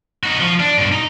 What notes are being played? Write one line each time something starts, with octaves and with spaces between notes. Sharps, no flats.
D#4 F#4
F3
D4
G2 B2
D#4 A#5